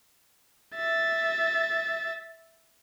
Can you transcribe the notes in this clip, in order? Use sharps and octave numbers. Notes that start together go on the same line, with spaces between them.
E5 A6